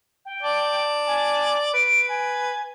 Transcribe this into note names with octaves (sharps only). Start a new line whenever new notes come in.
G5
D5 A5
G#5
B4 D7
G#5